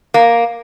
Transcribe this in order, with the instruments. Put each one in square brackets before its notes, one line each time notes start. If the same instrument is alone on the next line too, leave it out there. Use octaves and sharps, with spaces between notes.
[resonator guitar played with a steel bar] A#3